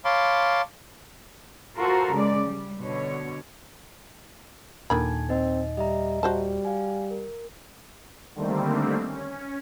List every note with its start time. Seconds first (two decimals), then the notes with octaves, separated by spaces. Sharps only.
0.05 C#5 F5 A5 B5 C6 D6
1.77 F4 F#4 A4 A#4 C5
2.11 C#3 G#3 D5
2.45 G3
2.80 B2 D3 C#5
4.90 D#2 A#2 D3 D#3 G#5 A5 B5 G#6
5.29 C4 D#4 D#5
5.77 G3 D#5 E5 A#5
6.23 G3 F#4 C5 A5
6.65 F5 G#5
7.11 A#4
8.35 D3 D#3 G3 A3 A#3 C4
9.06 C#4